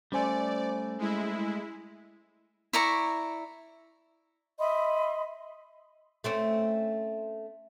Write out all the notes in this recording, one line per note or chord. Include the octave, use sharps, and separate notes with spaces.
G3 A3 C#4 C5 D5 G#5
G#3 E4
E4 D5 A#5 C#6
D#5 E5 B5 C6
A3 C4 C#4